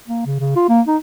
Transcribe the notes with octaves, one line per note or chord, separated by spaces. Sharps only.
A#3
C#3
C#3
F4
A#3
D#4